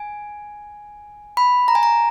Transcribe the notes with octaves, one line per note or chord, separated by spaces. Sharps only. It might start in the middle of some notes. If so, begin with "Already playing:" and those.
Already playing: G#5
B5
A#5
G#5
A#5